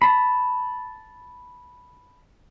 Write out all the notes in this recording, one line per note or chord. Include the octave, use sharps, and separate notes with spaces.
A5 B5